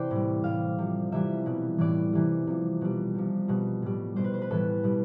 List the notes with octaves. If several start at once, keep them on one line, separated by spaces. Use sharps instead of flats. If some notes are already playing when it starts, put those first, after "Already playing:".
Already playing: C3 E3 C5 D5 G5
A2 G3
A2 G3 F5
C3 F3
C3 E3 G3 E5
B2 G3
A2 E3 G3 D5
C3 E3 G3
C3 F3
B2 G3
C3 F3
B2 G3
A2 G3
B2 G3 C5
B4
C5
B4
A2 E3 G3 A4
B2 G3